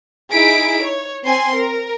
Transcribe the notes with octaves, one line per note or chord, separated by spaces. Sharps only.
D#4 E4 G#4 B6 D7
C#5
C4 G#5 C6
A#4